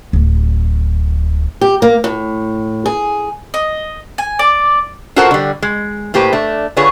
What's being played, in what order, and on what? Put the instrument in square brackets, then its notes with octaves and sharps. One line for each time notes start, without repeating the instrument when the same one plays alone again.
[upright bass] D1
[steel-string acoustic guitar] G4
A#3
A2
G#4
[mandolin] D#5
G#5
D5
[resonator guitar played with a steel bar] F4 F#4 A4 A#4 C5 F#5
D3 G3
G#3
A2 A#3 G4 B4 C5
A3 D4
D3 F4 G#4 B4 C#5